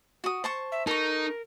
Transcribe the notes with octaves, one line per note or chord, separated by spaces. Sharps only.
F#4 D#6
C5 A5 C#6
E5
D#4 A4 A#4 C#6